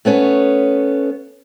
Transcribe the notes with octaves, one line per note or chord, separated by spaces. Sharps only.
A3 B3 C#4 C#5